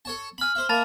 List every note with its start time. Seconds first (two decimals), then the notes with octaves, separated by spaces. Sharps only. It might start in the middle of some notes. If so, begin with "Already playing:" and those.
0.05 A4 C#5 A5
0.38 G#5 B5 F6 F#7
0.55 C5 E5
0.69 A#3 E5 A5 B5 A6